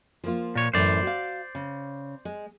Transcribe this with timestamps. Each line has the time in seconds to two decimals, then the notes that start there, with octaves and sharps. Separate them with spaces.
0.24 F3 A#3 F4
0.55 A#2 C#5
0.73 F#2 A2 E3 C5 D5
1.03 F#4 F5
1.55 C#3
2.25 G#3